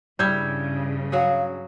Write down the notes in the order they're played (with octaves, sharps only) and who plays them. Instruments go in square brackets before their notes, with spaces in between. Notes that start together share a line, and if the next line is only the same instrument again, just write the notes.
[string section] G2 C#3 [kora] G3 E4 [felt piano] G6 G#6
[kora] F#3 F#4 G#4 [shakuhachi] F5